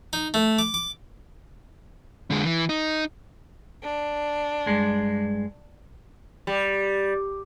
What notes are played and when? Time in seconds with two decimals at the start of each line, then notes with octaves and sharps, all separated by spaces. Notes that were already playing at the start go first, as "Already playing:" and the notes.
0.13 D#4
0.34 A3
0.59 D6
0.74 D6
2.30 D3 G#3
2.45 E3
2.69 D#4
3.83 D4
4.66 G2 G#3
6.47 G3